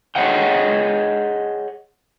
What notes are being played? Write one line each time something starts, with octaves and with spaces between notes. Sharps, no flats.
G#4 C#5 D#5 F#5 G5